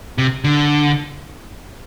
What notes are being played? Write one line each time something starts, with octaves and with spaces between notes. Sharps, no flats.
C3
D3